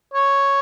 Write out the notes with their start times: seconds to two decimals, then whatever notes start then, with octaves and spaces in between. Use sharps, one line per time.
0.14 C#5